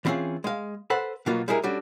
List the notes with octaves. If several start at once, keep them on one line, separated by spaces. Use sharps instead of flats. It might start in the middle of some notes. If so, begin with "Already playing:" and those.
E3 G3 C4 C#4 F4 G#4
G#3 F5
A4 B4 C5 F#5
B2 F#3 A#3 B3 F4
G3 G#3 E4 G#4 A#4
G3 C#4 D4 F#4 A4